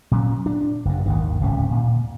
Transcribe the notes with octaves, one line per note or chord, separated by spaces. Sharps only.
A#2 F#3 C#4
D4
F#1 G2
G#1 D#2 D#3
D1 C#2 C3 C#4
A#2